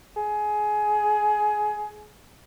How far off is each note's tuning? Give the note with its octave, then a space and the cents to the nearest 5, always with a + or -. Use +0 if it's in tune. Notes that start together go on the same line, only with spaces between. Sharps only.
G#4 +20